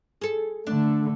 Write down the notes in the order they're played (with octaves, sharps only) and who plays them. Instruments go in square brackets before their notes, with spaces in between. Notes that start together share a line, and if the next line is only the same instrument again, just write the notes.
[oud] G#4 A4
[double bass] D3 A3 [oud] D4